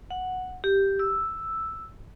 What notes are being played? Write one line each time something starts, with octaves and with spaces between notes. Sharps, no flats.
F#5
G4
E6